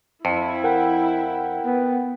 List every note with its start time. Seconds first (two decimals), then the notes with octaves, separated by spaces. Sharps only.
0.25 F2 E4
0.64 A#4 F#5 G5
1.66 B3